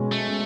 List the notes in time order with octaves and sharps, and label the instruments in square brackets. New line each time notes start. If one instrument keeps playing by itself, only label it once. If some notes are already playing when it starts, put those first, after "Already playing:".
Already playing: [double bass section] B2 G#3 C#4
[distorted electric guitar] A3